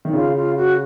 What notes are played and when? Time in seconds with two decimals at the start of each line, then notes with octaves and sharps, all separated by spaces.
0.05 D#3
0.13 C#3 F4
0.35 F4
0.57 F#4